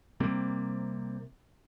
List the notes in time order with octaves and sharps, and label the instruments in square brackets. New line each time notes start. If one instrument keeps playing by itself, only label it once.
[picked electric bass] C3 G3 A#3 C4